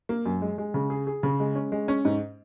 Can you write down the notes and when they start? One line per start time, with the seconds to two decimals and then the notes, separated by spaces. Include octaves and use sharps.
0.09 A#3
0.26 F#2
0.42 G#3
0.58 G#3
0.74 C#3
0.90 G#4
1.07 G#4
1.23 C#3
1.40 G#3
1.55 C#4
1.72 G#3
1.88 C#4
2.05 G#2